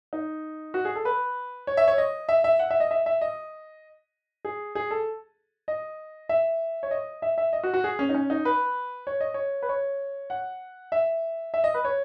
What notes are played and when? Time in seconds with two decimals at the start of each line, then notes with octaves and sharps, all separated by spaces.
0.13 D#4
0.74 F#4
0.85 G#4
0.95 A4
1.05 B4
1.67 C#5
1.77 E5
1.88 C#5
1.98 D#5
2.29 E5
2.44 E5
2.59 F#5
2.70 E5
2.80 D#5
2.91 E5
3.06 E5
3.21 D#5
4.45 G#4
4.75 G#4
4.91 A4
5.68 D#5
6.29 E5
6.83 C#5
6.91 D#5
7.22 E5
7.38 E5
7.53 D#5
7.64 F#4
7.74 F#4
7.84 G#4
7.99 C#4
8.09 D#4
8.15 C#4
8.30 D#4
8.45 B4
9.07 C#5
9.21 D#5
9.34 C#5
9.62 B4
9.69 C#5
10.30 F#5
10.92 E5
11.54 E5
11.64 D#5
11.74 B4
11.85 C#5